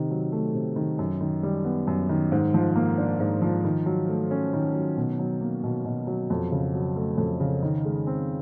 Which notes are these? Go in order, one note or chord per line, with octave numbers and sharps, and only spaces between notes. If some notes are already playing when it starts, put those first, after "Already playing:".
Already playing: C3 D#3
F#3
A3
C3
D#3
F#2
D#3
G3
B3
F#2
D#3
G#2
F3
A#3
D4
G#2
F3
D#3
F#3
A3
C#4
D#3
F#3
B2
F#3
A#3
B2
B2
F#3
F2
C#3
F#3
A3
F2
C#3
D#3
G#3
C4